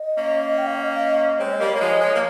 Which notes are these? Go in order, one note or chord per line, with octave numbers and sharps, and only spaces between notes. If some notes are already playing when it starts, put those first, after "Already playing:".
Already playing: D#5
A#3 C#4
G5
F5
D#5
F5
D#5
G#3 C4 C#5
D#5
G3 A#3
C#5
A#3
F3 G#3
F3 G#3
A#3